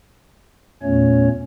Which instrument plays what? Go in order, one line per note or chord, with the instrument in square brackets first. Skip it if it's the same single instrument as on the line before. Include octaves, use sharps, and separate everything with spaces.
[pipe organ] E2 A#2 A3 C#4 C#5